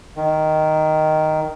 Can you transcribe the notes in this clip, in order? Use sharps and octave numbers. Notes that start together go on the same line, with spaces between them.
D#3